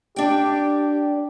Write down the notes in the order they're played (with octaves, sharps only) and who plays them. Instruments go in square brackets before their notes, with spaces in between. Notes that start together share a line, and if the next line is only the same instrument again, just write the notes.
[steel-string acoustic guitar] D4 G5 [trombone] G4